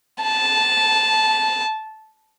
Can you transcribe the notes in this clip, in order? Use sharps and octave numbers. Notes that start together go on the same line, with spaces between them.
A5